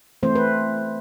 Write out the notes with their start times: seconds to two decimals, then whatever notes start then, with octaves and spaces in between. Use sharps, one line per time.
0.23 E3 A3 C4 C5
0.35 B4